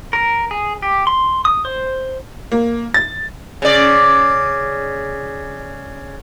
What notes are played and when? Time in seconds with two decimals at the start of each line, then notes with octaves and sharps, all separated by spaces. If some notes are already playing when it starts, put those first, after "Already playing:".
0.13 A#4
0.51 G#4
0.82 G4
1.07 C6
1.45 D#6
1.65 C5
2.52 A#3
2.94 A6
3.62 C#3 D5